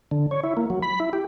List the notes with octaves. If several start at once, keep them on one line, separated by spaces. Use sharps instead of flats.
D3
C#5
E4
A#3
F#3
B5
E4
G4